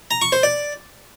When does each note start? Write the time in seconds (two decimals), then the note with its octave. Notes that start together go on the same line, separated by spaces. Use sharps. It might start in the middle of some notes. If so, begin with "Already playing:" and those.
0.11 A#5
0.22 C#6
0.32 C5
0.43 D5